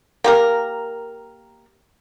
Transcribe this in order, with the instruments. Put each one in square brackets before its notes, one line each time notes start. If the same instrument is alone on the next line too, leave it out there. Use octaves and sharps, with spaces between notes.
[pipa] A#3 G4 A#4